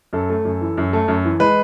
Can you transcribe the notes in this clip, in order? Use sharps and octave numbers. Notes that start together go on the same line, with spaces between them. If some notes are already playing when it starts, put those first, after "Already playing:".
F#2 A4
A3
F#2
E3
F#2
A3
F#2
E3
G#3 B4